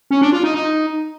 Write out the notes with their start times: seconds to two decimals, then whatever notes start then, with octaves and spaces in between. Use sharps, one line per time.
0.11 C#4
0.22 D4
0.32 F4
0.43 D#4
0.54 D#4